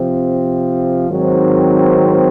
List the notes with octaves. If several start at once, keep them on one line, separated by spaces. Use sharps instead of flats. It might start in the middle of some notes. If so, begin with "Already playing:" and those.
Already playing: C3 F3 C4
G#2 D#3 F#3 C4